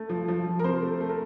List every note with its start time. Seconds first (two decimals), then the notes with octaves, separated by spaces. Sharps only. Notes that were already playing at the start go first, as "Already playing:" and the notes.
Already playing: A3
0.09 F3
0.28 F3
0.46 F3
0.59 A#4
0.64 C3 C5
0.82 A3
1.00 A3
1.09 A#4